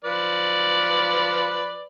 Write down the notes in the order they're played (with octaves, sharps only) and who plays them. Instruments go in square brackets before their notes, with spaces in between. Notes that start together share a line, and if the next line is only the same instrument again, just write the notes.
[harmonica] F3 B4 D5